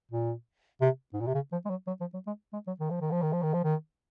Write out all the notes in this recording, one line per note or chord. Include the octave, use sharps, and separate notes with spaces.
A#2
C3
G#2
A#2
C3
C#3
F3
G#3
F#3
F#3
F3
F#3
G#3
G#3
F#3
D#3
F3
D#3
F3
D#3
F3
D#3
F3
D#3